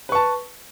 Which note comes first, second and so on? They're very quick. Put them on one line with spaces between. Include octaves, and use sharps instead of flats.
B4 C#6 A5